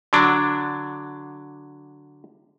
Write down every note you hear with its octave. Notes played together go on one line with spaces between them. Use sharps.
D3 F#3 D4